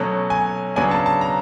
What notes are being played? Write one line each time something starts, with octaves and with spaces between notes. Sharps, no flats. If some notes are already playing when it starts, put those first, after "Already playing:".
Already playing: B2 F#3 A3 C#4
G#5
C#3 F#3 B3 D4 G#5
A5
A5
A#5